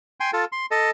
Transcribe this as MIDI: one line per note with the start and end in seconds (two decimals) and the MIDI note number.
0.20 0.31 79
0.20 0.31 80
0.20 0.31 84
0.33 0.45 65
0.33 0.45 69
0.52 0.66 84
0.71 0.91 69
0.71 0.91 75